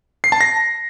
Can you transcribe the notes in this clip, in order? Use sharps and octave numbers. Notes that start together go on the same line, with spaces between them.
C7
A5
A#6